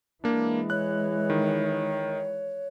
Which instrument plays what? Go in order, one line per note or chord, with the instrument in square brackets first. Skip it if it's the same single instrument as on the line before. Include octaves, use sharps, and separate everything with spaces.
[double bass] E3 G#3 [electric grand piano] A#3 D4
[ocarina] C#5 [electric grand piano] F#6
[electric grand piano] D#3